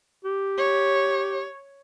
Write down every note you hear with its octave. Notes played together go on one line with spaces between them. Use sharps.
G4
C#5